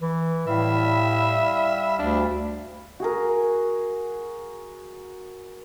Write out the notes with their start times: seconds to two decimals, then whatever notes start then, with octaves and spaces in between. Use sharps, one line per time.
0.02 E3
0.47 A2 G3 E5 F5 B5
1.99 D2 D4
3.00 F#4 G#4 A#4